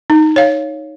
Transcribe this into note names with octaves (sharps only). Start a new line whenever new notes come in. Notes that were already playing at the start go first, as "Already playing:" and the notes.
D#4
C#5 F5